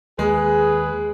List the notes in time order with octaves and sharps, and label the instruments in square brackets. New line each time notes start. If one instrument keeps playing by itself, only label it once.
[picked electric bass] D#2 [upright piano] G#3 [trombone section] G#4 [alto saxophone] B4